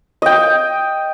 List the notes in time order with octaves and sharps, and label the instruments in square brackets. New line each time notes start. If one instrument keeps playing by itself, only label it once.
[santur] D#5 G5